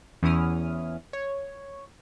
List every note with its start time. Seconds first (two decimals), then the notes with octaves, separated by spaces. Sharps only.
0.23 E2 C#4 E4 D#6 F6
1.13 C#5